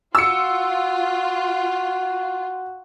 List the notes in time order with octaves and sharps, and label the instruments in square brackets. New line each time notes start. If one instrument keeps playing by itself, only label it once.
[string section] F4 [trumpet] F#4 [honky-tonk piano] E6 C#7